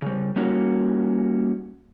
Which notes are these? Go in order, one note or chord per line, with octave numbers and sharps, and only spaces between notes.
C#3 G3
G3 A#3 C#4 D#4 F#4